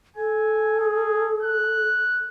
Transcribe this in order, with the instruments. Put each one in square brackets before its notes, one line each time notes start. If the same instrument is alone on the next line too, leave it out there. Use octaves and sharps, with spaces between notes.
[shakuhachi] A4 [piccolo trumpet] G#5
[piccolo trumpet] G#4
F#6